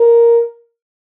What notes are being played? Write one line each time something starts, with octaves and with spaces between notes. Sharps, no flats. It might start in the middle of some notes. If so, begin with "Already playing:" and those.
Already playing: A#4